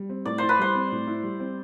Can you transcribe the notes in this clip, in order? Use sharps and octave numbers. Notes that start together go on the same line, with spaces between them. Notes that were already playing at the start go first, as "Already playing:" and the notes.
Already playing: G3
C4
A2 D5
E4 C5
B4
G3 C5
C4
A2
E4
G3
C4